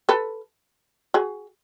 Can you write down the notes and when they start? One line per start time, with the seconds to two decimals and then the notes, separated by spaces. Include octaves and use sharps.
0.09 A4 B4
1.14 F#4 G#4